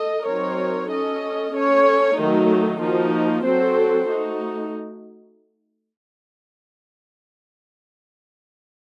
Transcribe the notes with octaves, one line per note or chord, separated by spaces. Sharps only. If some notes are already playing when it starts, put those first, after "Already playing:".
Already playing: A4 D#5
F#3 C4 D#4 A#4 C#5
C#4 A4 D#5
C#4 A4 C#5
D#3 F#3 A3 D#4
F3 A#3 D#4 F#4
F#3 C4 F#4 A4 C5
A3 D#4 F#4